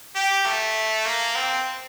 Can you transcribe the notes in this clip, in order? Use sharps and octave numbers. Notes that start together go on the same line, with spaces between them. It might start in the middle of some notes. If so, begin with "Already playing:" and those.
G4
A3
A#3
C4